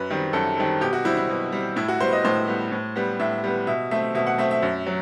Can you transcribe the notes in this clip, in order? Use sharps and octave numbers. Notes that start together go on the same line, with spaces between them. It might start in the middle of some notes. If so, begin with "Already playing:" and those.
Already playing: F#2 B4
D#3 G3 C4
F#2 A4
D#3 G3 C4
B2 G4
F#4
G3 C4 E4
E4
B2
G3 C4
A2 E4
F#4
G3 B3 C5
D#5
A2 C5
G3 B3
A2
G3 B3
A2 E5
G3 B3
B2 E5
A3 C4 E5
B2 E5
F#5
A3 C4 E5
E5
F#2
F#3